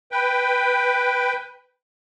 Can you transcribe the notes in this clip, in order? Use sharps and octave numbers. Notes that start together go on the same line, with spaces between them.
B4 G5